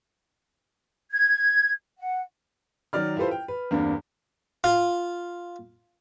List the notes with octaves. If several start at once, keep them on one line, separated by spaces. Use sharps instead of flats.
G#6
F#5
D#3 F#3 D5 F6
E4 F4 G4 A4 B4 C5
G5
B4
E2 G2 A#3 C4 D4
F4